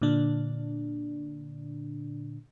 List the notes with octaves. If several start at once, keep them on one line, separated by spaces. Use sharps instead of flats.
A#2 D3 D4